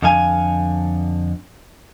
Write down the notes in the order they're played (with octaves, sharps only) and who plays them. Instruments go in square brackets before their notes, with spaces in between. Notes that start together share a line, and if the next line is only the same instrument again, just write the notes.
[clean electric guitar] F2 D3 F5 G#5